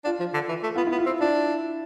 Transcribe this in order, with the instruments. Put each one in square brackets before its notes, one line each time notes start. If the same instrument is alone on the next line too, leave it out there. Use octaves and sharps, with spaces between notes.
[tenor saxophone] D4 [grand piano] F4
[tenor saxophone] F3
D3
E3
A3
[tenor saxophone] B3 [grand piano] F4
[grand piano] E4
[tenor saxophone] B3
[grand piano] F4
[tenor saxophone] C4
[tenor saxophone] D4 [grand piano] E4